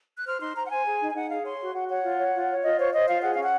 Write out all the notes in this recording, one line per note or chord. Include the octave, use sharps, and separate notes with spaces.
F#6
C5 F6
D#4 C6
C5 A#5
F#5
C5 G#5
G#4
D#4
G#5
D#4 F#5
G#4 F5
C#5 C6
F#4
F#4 F#5
C#5 F#5
F4
C#5
F4
C#5
F4 D#5
C5 C#5
C5 D#5
F4 F5
G#4 F#5
C#4 F5
F#5